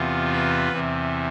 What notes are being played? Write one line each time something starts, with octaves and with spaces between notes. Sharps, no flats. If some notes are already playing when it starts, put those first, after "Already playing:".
Already playing: E2 C3 E3 B3 F4
B4
E2 C3 E3